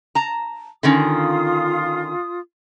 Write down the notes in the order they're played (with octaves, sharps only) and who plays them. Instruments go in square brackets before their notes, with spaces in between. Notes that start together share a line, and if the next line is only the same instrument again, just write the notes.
[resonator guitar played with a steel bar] A5 A#5
[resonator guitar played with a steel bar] D3 D#3 C#4 [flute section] F4 D#6